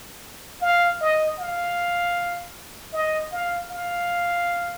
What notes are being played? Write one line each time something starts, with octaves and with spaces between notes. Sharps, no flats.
F5
D#5
F5
D#5
F5
F5